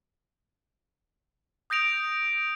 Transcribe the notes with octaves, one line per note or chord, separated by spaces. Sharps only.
D#6 G6 A#6 D7 F7